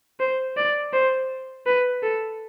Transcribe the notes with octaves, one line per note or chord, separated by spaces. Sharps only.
C5
D5
C5
B4
A4